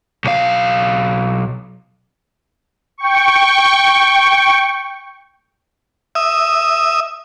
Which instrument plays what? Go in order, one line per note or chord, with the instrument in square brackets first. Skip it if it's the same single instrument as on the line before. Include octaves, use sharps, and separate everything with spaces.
[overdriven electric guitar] B1 F5
[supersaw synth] G5 C#6
[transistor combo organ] E5 D#6